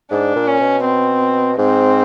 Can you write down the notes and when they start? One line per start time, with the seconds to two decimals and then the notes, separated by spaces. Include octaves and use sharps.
0.11 G#2 D4
0.36 A#2
0.47 C#4
0.60 B2
0.84 C4
1.58 G#2 C4